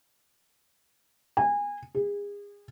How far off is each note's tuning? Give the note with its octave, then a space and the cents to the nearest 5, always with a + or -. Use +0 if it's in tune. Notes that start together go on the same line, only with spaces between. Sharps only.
G#5 -25
G#4 -35